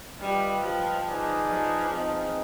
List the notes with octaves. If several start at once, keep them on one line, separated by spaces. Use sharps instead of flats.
G3 F4 B4 D#5 G5
F3
D#4 G#4 B4 D5
F3
C4 D#4 G#4 B4 D#5